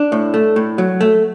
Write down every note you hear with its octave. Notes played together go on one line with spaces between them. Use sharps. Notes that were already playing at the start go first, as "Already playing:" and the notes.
Already playing: D4
A2
A3
A2
F#3
A3